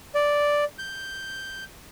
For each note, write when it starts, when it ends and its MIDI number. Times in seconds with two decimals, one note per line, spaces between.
0.15 0.64 74
0.79 1.64 91